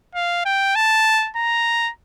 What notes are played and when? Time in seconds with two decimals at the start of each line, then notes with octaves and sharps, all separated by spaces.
0.15 F5
0.45 G5
0.75 A5
1.36 A#5